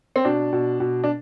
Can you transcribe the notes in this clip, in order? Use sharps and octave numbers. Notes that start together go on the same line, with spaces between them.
C4
B2 D4
B2
B2
D4